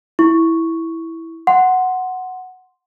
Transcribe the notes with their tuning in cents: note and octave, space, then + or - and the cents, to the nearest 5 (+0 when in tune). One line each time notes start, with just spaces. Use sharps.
E4 -5 C#6 +0
F#5 +0 C6 +0